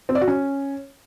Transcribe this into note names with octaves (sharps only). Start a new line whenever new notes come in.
C4
D5
F#4
C#4